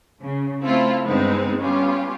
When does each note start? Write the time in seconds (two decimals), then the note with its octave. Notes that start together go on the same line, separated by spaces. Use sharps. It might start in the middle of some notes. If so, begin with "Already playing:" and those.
0.20 C#3
0.64 A3 C4 E4 F4 A4
1.04 G2 D3 G#3 B3 C4 D#4
1.60 G3 B3 C#4 F4